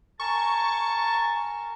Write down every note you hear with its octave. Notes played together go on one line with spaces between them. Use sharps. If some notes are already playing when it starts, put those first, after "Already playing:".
A#4 G#5 A5 C#6